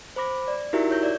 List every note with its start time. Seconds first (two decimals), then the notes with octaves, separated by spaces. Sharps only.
0.16 C5 B5 D6 A#6
0.48 D5
0.73 D#4 E4 F#4 G4 A#4 E5
0.91 C#5 G6 A#6
1.03 D5